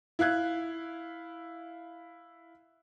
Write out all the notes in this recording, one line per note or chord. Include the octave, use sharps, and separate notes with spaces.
E4 F5 F#6 G#6